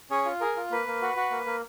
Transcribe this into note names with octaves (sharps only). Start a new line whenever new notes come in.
C#4 G#4 C#5
F4
G#4 A#4
F4
A#3 B4
A#3
F#4
F#4
A#3
A#3